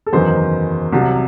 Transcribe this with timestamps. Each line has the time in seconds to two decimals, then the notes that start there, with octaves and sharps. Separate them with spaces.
0.06 A4
0.13 F#1 E2 D#3 F#3 C5
0.92 C2 C3 F#3